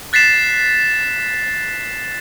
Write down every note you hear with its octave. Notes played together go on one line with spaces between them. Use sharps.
F#6 A6 B6 C7 E7